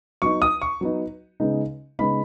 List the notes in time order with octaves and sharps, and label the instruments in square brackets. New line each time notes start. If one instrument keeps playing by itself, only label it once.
[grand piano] F#3 B3 D#4 C#6
D#6
C#6
F#3 B3 D#4
C#3 G#3 B3 D#4
C#3 G#3 B3 D#4 B5